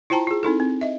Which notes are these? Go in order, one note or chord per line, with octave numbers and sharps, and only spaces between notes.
E4 F4 C5 G5 A5 A#5
F4 G#4
C4 D#4 E4 A4
C4
D#5 E5